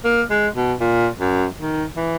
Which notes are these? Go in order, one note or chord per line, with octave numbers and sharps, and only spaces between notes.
A#3
G#3
B2
A#2
F#2
D#3
E3